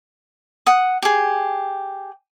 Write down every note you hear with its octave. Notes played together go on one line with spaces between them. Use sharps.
F#5 D#6
G4 G#4